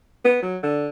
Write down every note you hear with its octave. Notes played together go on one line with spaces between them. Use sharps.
B3
F#3
D3